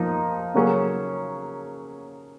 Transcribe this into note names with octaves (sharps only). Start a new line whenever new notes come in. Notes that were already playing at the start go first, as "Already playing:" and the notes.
Already playing: F3 A#3 D#4
C#3 F#3 A#3 C#4 G#4